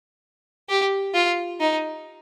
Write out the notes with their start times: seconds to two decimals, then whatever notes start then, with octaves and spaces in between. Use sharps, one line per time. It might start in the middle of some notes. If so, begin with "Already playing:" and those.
0.69 G4
1.14 F4
1.60 D#4